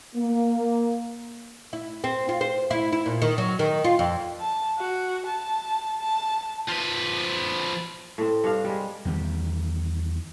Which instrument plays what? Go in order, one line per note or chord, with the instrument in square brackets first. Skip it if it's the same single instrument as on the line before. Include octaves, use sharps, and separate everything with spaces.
[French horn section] A#3
[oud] E4
C4
F4
C5
E4
E4
A#2
D#3
F#3
D#3
F4
F2
[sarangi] A5
F#4
A5
A5
[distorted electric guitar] F3 B4
[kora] A2 C4
G2 D4 F5
G3 G#3
[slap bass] E2 D#3 G3